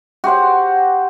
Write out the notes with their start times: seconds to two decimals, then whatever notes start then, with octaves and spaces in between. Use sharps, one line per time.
0.24 F#4 G4 C5 F#5